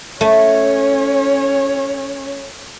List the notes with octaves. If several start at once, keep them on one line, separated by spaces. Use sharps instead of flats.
A3 C#4 C#5